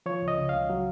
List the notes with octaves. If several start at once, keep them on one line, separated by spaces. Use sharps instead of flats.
F3 C#5
C#2
D#5
C#3
C#2 F5
F#3